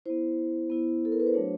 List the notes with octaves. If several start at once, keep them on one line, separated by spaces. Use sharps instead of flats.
B3 E4 C5
B3 E4
A4
A#4
B4
C5
F#3 A3 D4 F#4 C#5